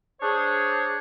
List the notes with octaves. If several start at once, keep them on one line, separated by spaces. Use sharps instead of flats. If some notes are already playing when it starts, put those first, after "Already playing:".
D4 G#4 C5 C#5